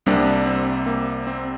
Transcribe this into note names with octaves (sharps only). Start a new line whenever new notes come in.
C2 C3 G3 A#3 D4
C4
A#3
C4